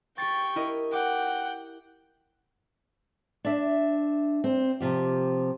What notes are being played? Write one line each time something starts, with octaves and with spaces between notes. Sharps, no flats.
G4 G5 C#6 A6
E4 A#4 D#5
F#5 G5 D6 D7
D4 E5
C4
C3 F3 G4